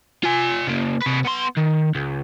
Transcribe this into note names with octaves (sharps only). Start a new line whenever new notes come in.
F4 G#5
C#3 A#3
C3 B4
B3 C6
D#3
C#2